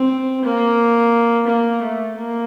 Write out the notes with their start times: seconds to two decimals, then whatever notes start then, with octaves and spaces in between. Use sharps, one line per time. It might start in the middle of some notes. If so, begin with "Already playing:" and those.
Already playing: C4
0.45 A#3
1.47 A#3
1.82 A3
2.16 A#3